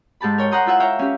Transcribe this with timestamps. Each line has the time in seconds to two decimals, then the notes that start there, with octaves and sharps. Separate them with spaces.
0.21 G#2 G4 A5 B5
0.38 A#4 C#5 G5
0.51 F#5 G5 A#5 C6 D#6 G6
0.66 E4 F4 E5 F#5 G#5
0.80 C#5 E5 F5 G5 A#5
0.99 C#4 G4